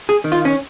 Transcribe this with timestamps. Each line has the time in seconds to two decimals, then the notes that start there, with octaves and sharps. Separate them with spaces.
0.09 G#4
0.24 D#3
0.32 F4
0.45 C#4